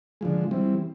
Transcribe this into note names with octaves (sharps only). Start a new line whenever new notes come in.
D3 F3 G#3
E3 G3 C4